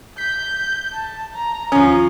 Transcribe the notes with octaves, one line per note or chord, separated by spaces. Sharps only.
G6 B6
A5
A#5
D#2 F3 C#4 F4 D#6